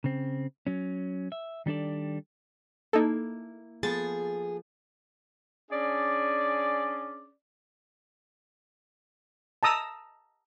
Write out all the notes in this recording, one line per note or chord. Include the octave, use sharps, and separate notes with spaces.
C#3 C4
F#3 C#4
E5
D#3 G3 D4 A4 D5
A#3 D#4 E4 A4
F3 B3 G#4 A4 A6
C#4 D4 G#4 D5
A5 A#5 D#6 E6